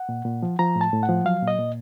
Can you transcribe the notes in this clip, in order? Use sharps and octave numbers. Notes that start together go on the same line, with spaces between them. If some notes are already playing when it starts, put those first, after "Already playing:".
Already playing: F#5
A#2
A#2
F3
F3 A#5
A2
A5
A2
F#5
F3
F#3 F5
A#2
D#5
A#2